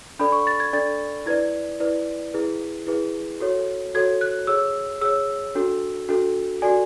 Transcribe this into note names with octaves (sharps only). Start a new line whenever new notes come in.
D4 A4 D5 B5
C#6
A6
G#6
D4 A4 D5 A6
E4 B4 D5 G#6
E4 B4 D5
E4 G#4 B4
E4 G#4 B4
F#4 A4 C#5
F#4 A4 C#5 G#6
F#6
G#4 C#5 E6
G#4 C#5 E6
D4 F#4 A4
D4 F#4 A4
F#4 A4 D5 G#5